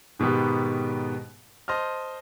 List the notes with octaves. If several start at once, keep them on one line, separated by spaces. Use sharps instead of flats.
G#2 B2 D#3 B3 G4
C5 D#5 A5 F6